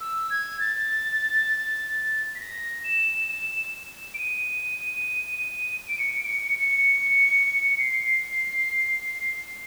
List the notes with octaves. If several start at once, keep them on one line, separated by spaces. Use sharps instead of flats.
E6
G#6
A6
B6
A#6
E7
E7
D7
D#7
D7
C#7
D7
C#7
C#7
C#7
C7